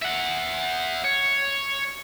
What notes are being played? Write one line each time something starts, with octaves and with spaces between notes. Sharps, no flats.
E5 F#5
C#5